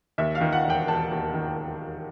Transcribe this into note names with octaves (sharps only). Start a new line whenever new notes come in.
D#2 E5
F5
D#3
F#5
E1
G5
E1 A5
D#2
D#3